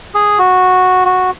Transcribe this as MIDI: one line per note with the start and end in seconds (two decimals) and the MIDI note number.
0.15 0.39 68
0.39 1.04 66
1.05 1.31 66